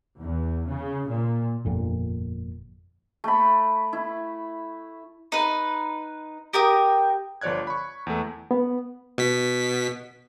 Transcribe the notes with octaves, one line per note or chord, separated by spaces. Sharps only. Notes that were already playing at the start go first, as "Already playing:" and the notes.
E2
C#3
A#2
G1 F2 A#2
A3 B5
E4
D#4 B4
G4 A#4 G5 D#6
G1 F3 C#5 D5 F#6 G#6
B5 C#6
E2 A3
B3
B2 B6